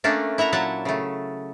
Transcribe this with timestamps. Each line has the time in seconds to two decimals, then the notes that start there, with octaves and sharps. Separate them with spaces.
0.04 A3 A#3 C#4 D4
0.38 E4 E5 F#5 A#5
0.52 A#2 F#3 E5 F#5 A5
0.85 C#3 A3